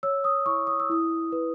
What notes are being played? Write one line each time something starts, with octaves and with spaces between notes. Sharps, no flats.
C#5 E6
D#6
E4 C#6
D#6
E6
E4 D#6
B4